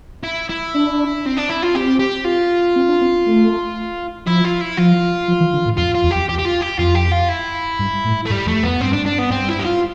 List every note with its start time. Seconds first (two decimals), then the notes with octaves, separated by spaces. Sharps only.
0.23 E4
0.49 E4
0.74 D4
1.26 C4
1.37 D4
1.50 E4
1.63 F4
1.75 C4 G4
1.99 G4
2.25 F4
2.76 C4
2.88 D4
3.01 C4
3.26 A3
4.26 F3 E4
4.44 F4
4.61 E4
4.77 F3 F4
5.28 F3
5.41 E3
5.53 D3
5.66 A2
5.78 F2 F4
5.95 F4
6.04 E2
6.11 F2 G4
6.29 E2 G4
6.39 G4
6.45 F4
6.62 G4
6.78 F2 F4
6.95 G4
7.12 F4
7.29 E4
7.79 G2
8.05 A2
8.26 A3
8.30 G2 G3
8.46 F2 A3
8.63 F2 B3
8.81 G2 C4
8.93 D4
9.06 D4
9.18 B3
9.31 G2 C4
9.48 E4
9.59 G4
9.65 F4